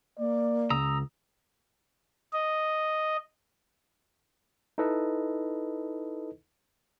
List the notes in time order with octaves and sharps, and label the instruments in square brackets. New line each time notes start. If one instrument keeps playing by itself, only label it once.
[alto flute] A#3 [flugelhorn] D5
[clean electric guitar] C#2 [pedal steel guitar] A#5 D#6 E6
[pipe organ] D#5
[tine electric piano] D#4 E4 A4 B4 D#5